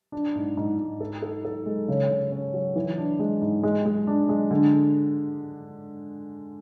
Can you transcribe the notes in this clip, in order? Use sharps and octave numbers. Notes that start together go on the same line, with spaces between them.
D4
G#2
G#2
G#2
A4
A4
A4
G#3
C#3
C#3
C#4
F#3
E3
D4
G#3
G#2
G#3
G#3
D4
G#3
D3